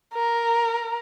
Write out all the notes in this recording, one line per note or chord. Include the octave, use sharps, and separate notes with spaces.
A#4